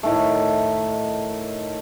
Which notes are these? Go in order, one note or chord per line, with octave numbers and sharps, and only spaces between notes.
A2 D#3 A3